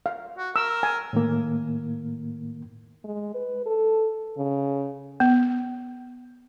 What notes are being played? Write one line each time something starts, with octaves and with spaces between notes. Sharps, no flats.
F5
F#4
A#4 E6
G#5
A2 D#3 A#3
G#3
B4
A4
C#3
B3